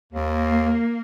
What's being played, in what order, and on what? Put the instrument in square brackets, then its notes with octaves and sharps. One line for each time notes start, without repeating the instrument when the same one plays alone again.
[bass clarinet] D#2 [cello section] A#3